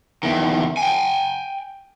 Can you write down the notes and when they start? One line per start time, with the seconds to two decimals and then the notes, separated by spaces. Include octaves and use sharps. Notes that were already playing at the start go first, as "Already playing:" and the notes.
0.23 E2 D#3
0.77 G5 G#5